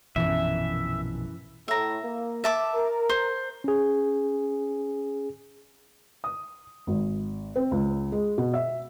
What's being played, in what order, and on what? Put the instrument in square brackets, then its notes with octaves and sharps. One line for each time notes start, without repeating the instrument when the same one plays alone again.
[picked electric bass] A#1 B2 [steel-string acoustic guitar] F#2 E3 [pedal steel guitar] E5
[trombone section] A2 [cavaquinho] E5 A#5
[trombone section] A#3
[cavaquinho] E5 A5 D6
[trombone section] A#4
[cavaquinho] C5
[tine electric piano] C#4 G#4
[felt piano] D#6
G#1
C4
C#2
G#3
B2
E5